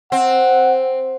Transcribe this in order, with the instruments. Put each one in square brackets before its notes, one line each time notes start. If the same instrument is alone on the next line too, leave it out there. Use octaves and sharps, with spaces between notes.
[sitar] C4 [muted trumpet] F#5